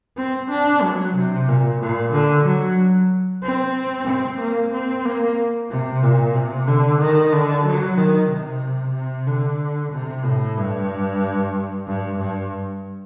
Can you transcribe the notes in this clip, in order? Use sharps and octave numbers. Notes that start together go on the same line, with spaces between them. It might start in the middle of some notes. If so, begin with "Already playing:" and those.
C4
D4
F#3
C3
A#2
A#2
D3
F#3
C4
C4
A#3
C4
A#3
C3
A#2
C3
D3
D#3
D3
F#3
D#3
C3
C3
D3
C3
A2
G2
G2
G2